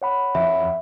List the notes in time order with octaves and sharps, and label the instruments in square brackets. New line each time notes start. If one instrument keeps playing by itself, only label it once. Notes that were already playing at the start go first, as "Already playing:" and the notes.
[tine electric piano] C#5 F#5 B5
[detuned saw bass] F2 [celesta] E5